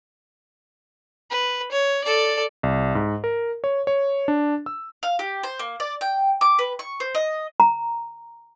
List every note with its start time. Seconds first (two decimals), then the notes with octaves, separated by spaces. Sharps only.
1.30 B4
1.71 C#5
2.04 A4 D5
2.63 C2
2.95 G#2
3.24 A#4
3.64 C#5
3.87 C#5
4.28 D4
4.66 E6
5.03 F5
5.19 G4
5.43 C5
5.59 A#3
5.80 D5
6.01 G5
6.41 D6
6.59 B4
6.79 C#6
7.00 C5
7.15 D#5
7.60 A#5